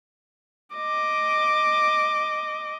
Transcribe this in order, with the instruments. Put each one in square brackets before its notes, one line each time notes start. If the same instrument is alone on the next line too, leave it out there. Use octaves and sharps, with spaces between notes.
[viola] D#5 D6